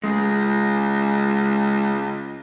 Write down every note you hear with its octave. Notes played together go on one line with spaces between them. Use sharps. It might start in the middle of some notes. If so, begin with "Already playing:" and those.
C#2 G#3